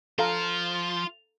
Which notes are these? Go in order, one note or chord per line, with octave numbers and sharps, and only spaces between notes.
F3 F4 A4 F5 A#5